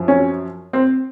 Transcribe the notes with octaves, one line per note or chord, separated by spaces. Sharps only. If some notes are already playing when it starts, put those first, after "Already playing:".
Already playing: F#2 F3
C#4
C4